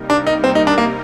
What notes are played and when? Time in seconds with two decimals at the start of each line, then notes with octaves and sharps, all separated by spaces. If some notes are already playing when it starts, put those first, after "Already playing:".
Already playing: C3 G3 A#3 D#4 A#4
0.10 D4
0.26 D#4
0.44 C4
0.55 D#4
0.67 D4
0.78 A#3